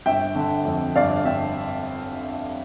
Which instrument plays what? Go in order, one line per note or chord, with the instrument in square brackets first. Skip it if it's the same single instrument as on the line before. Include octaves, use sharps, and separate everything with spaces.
[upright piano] G1 E5 G5
D3
F2
G1 D5 F5
G1 E5 G5